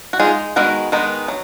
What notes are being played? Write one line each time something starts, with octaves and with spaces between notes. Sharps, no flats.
F#4
G#3 D#4 F4 G#4
D#3 G#3 B3 F#4 A#4
D#3 G#3 B3 D#4
F#3